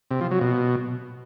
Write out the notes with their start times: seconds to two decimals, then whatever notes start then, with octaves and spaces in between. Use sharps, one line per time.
0.11 C3
0.21 F3
0.31 F#3
0.41 B2